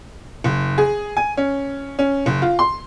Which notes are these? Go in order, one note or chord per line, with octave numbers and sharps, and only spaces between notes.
F#1
G#4
G#5
C#4
C#4
F#1
F4
C6